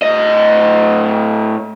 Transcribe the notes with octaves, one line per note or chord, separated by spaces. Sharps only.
A2 D#5